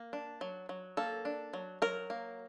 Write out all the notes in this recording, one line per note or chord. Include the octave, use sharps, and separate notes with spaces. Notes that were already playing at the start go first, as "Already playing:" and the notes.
Already playing: A#3
D4
F#3
F#3
A#3 A4
D4
F#3
F#3 A#4
A#3